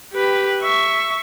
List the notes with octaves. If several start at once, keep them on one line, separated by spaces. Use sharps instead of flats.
G4 B4
E5 C#6